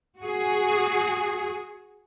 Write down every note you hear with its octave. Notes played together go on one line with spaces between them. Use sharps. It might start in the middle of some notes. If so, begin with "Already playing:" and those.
F#4 G#4